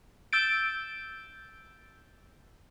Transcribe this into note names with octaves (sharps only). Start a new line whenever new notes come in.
E6 G6 A6 D7